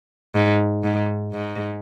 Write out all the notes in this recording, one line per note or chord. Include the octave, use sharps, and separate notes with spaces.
G#2
G#2
G#2